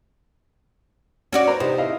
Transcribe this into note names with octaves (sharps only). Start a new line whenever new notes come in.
C#4 F#4 D5
B4 C5 A#5
C3 D#4 G4 C5
E4 D#5 F5